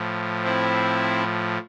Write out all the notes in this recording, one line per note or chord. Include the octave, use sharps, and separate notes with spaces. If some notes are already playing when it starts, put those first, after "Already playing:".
Already playing: A2 F3
C4 E4